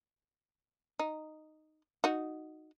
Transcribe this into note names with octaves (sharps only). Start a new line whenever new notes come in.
D#4
D#4 F#4